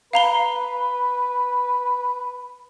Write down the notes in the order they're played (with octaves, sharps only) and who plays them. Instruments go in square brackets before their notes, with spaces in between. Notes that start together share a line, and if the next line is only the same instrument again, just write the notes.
[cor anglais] B4 [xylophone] F5 A#5 G7